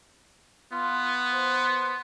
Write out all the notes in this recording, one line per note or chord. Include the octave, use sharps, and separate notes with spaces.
B3 F4
C5